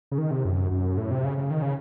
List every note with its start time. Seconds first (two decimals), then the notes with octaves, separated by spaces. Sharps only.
0.12 C#3
0.18 D#3
0.31 C3
0.45 F#2
0.71 F#2
0.97 A2
1.11 C3
1.24 C#3
1.37 C#3
1.51 D#3
1.62 C#3